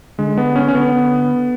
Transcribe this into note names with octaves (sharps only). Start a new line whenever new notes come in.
D3 G#3
B3
C#4
C#4
D3 B3